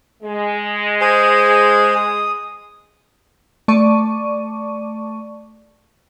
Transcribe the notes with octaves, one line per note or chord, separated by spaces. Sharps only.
G#3
G#4 C5 G#5
D#6
A3 D5 A5 C#6 D6 D#7